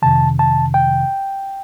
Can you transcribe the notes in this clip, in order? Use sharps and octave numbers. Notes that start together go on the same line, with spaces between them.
F2 C3 D#3 A5
A5
G5